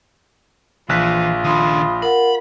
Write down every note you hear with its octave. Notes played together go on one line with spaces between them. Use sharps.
A#1 E3 F4 F#6 B6
D#3 D4 B5 C6 D#6
A#4 F#5 B5